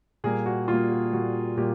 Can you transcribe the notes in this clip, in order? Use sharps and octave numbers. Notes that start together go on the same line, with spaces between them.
A#2 G3 A#3 G#4
F#4
A#2 G3 A#3 F4
F#4
A#2 G3 A#3 F#4
A#2 G3 A#3 G4